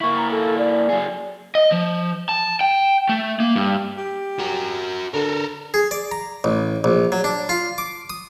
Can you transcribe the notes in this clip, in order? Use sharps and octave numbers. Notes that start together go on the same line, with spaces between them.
A#3 E4 C#6
A#5
A4
D5
F#3 G#4
D#5
F3
A5
G5
A3
A#3
G2
G4
F#4 A#4
D3 A4 A#4
G#4
D5
A#5
A1
A#1
F#3
D4
F4
D6
D#6